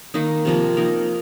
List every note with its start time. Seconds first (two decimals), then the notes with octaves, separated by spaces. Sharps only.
0.14 D#3 A#3 D#4
0.45 C3 F3 A#3
0.77 A#3 D#4 A#4